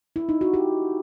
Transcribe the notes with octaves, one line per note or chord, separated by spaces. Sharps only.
E4
D#4
F#4
G4